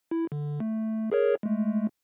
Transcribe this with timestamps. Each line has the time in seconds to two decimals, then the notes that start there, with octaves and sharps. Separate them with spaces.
0.11 E4
0.32 D3
0.60 A3
1.12 G#4 A#4 C#5
1.43 G#3 A3